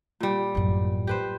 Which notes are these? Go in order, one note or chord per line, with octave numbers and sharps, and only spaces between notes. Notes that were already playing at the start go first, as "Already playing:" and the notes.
A#2 G3
A1 F#2
G4 B4 C5